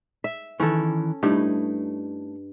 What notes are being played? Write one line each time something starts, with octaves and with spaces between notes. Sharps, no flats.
E5
D#3 E3 C#4 A4
G2 A3 D#4 E4